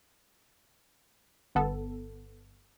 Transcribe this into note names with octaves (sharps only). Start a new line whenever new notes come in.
G1 B3 A4